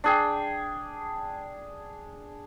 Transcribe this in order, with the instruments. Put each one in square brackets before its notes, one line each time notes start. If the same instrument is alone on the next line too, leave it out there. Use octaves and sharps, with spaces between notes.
[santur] D4 G#4 G5